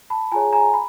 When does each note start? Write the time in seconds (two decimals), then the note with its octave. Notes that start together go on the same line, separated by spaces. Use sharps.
0.10 A5 B5
0.32 F4 G#4 C#5 G#5 A#5
0.53 G#5 A#5
0.74 B5